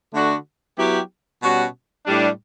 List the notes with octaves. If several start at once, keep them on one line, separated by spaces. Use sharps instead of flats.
D3 A3 D4 F#4
F#3 B3 E4 G4
B2 G3 C#4 F#4
A2 G3 D4